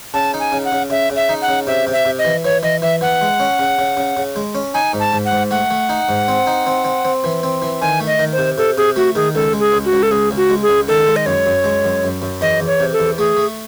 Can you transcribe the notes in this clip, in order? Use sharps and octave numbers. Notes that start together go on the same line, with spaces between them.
C#3 A5
D#4
G#5
C#3
F#5
C#3
C#3 E5
C#3
E5
D#4
F#5
C#3
C3 E5
C3
E5
C3
D#5
E3
E3 C#5
E3 D#5
E3 E5
E3 F#5
G#3
C#4
C#3
C#3
C#3
C#3
G#3
C#4
D#4 G#5
G#2
A5
G#2
F#5
G#2
A3 F#5
A3
D#4
G#2
C4
D#4
C4
C4
C4
E3
C4
E3
D#3 G#5
A3
D#5
D#3
C5
C3
C3 A4
C3 G#4
A3 F#4
D#3 G#4
C#2 A4
G#3
G#4
C#2
F#4
C#2
A4
C#2 G#4
C#2
F#4
G#3
G#4
C#2
D#3 A4
G#3
D#5
F#2 C#5
F#2
G#3
F#2
F#2
F#2
E2 D#5
E2
C#5
C3
A4
E2
A3 G#4
A3